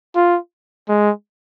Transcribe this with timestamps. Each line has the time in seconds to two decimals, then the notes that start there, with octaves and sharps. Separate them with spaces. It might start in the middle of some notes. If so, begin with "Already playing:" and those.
0.16 F4
0.89 G#3